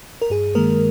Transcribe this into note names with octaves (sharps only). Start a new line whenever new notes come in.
A#4
G2 G#4
D#3 G#3 A#3 A#4